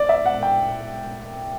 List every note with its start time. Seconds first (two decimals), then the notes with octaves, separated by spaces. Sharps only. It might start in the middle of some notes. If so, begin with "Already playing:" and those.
Already playing: D5
0.09 E5
0.26 F#5
0.43 G5